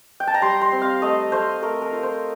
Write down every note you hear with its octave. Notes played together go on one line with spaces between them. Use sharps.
G5
A5
A#5
G3 C6
C6
C4
F5
A3 D#5
A3 C5
A3 A#4
A#4
F4
C5